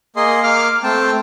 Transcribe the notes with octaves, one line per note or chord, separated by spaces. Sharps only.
A#3 G#4 D#5 C6
A#3 F5 D6 F6
A3 C4 G5 A5